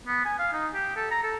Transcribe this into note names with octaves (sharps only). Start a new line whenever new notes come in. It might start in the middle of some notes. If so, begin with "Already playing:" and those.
B3
G#5
F5
D#4
G4
A4
A#5
A4